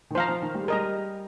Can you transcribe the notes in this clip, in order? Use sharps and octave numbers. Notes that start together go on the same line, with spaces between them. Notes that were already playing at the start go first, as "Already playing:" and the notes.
D#3
F3 C5 F5 A#5
F3
D#3
G3
G#3
G3 A#4 D#5 A#5